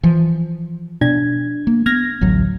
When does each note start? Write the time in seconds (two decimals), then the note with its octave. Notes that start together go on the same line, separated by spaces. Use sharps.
0.03 E3 F3
1.01 B2 D4 G#6
1.67 A#3
1.86 B3 F6 G#6 A#6
2.21 A1 D2 F#3